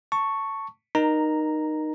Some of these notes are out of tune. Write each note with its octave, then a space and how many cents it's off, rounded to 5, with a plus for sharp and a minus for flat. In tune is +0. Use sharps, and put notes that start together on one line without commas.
A5 +20 C#6 +0
D#4 -15 A#4 +20 A#5 +0